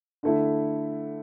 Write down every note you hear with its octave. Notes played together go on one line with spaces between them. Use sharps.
D3 A3 E4